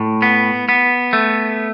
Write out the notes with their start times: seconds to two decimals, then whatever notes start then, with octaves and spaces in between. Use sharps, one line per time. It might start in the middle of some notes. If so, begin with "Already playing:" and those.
Already playing: A2
0.22 B3
0.69 B3
1.13 A3